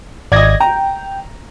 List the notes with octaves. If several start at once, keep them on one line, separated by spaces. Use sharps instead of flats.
G#1 D5 D#5 G#6 A#6
G5 A#5